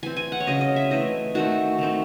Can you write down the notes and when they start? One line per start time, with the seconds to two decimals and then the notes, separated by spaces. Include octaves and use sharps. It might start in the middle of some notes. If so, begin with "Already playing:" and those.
0.03 E3 C4 G#5
0.17 G#5
0.32 F#5
0.40 C#5
0.47 C#3 F#3 C4 D#5
0.61 D#5
0.76 E5
0.91 E3 A3 C4 D#5
1.35 D#3 A3 C4 F#4
1.78 D#3 A3 C4